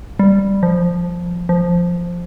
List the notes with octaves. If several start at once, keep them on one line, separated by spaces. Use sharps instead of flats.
G3
F3
F3